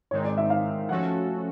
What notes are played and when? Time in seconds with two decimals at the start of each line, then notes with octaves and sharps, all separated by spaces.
0.11 G#2 D#3 G#3 C4 D#4 C#5
0.25 D5
0.38 E5
0.50 F5
0.89 F3 A3 C#4 F#4 A4 F#5